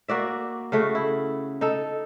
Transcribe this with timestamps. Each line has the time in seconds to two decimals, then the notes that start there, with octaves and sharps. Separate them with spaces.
0.08 A#3 F#4 D5 E5
0.72 C#3 A3 F#4
0.95 E4
1.61 D#4 A4